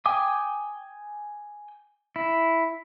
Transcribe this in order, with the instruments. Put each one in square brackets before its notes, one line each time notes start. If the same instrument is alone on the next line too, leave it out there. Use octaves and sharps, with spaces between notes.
[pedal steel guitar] G5 G#5 D6 D#6
E4